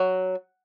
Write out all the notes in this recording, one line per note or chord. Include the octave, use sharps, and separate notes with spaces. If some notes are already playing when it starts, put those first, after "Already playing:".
Already playing: F#3